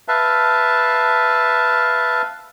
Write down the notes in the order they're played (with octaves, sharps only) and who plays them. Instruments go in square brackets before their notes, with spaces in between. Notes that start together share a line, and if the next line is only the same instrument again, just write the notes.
[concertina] B4 E5 F5 A5